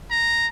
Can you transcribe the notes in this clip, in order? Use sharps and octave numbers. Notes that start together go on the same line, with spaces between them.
A#5